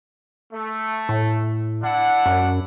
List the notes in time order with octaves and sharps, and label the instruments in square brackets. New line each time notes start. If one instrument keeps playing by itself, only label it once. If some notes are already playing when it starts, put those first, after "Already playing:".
[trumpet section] A3
[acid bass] A2
[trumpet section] D4 E4 F#5
[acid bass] F#2